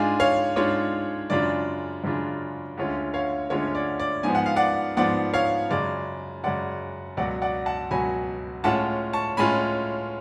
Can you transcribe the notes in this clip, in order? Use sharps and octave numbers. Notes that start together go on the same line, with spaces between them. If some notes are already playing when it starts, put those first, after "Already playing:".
Already playing: G#2 G#3 D4 F4 F5 G#5
C#5 F5
G#2 G#3 D4 F4 C#5
F#2 C#3 G#3 D4 F4 D5
F#2 C#3 G#3 D4 F4
D2 D3 G#3 C#4 F4
C#5 F5
D2 D3 G#3 C#4 F4 C#5
D5
D5
G#2 F3 B3 G#5
F#5
F5
D5 F#5
G#2 F3 B3 D5 F#5
C#5 F5
F#2 C#3 G#3 D5
F#2 C#3 G#3 D5 F#5
C#2 B2 F#3 D5 F#5
D5 F#5
F#5 A5
C#2 B2 F#3 G#5 B5
A2 G#3 C#4 F4 F#5 A5
A5 C#6
A2 G#3 C#4 F4 G#5 B5